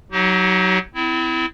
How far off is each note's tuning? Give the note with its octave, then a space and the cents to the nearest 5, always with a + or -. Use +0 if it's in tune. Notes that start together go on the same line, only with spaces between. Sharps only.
F#3 +0 D#4 +30 G4 -45
C4 -35 E4 +0